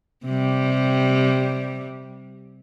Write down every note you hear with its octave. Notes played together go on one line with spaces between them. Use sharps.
C3 G3